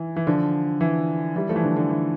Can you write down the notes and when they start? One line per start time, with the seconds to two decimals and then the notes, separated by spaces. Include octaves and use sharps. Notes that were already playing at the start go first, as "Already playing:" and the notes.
Already playing: E3
0.16 E3
0.27 D3 F3
0.81 E3
1.36 E3 G3
1.49 F3 A3
1.56 E3
1.63 D3
1.76 D3
1.90 E3